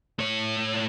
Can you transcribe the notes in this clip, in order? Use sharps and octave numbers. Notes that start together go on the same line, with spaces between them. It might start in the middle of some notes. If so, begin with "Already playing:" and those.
A2 C#5